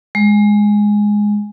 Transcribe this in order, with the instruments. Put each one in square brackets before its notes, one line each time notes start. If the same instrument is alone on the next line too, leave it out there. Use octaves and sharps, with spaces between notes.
[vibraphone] G#3